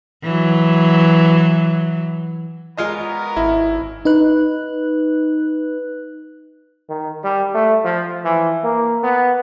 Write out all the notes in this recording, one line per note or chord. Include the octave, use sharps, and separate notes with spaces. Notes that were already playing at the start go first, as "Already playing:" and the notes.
E3 F#3
G#3 B3 C#4 F4 A#4 D#5
G#1 E4
D#4 B4 F#6
D#3
G3
A3
F3
E3
A#3
B3